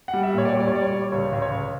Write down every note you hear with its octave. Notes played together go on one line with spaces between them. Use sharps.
F#5
G3
E5
A#2 C#5
D5
G3 C#5
D5
C#5
G3 D5
C#5
G3
C#2 C#5
C#2
C#5
C#2